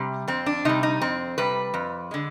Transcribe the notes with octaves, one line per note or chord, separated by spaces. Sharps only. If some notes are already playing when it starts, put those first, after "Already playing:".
Already playing: C3 G3
F2 C4
D4
C3 G3 D#4
D#4
F2 C4
C3 G3 B4
F2
D3 G#3